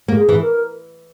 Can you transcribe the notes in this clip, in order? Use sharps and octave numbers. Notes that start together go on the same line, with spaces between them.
A#3
G#4
E3
A#4